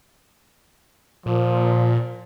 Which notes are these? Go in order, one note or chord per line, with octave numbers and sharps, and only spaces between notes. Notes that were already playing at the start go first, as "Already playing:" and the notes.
A#2 F3